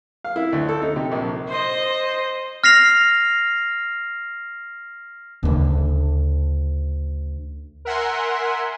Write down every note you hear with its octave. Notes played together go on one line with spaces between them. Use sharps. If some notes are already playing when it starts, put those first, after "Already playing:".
F5
E4
D2
A4
D#4
C3
A#1
C5 D#5
F6 A#6 C7 F7
D2 C#3
A#4 E5 F#5 G#5 C6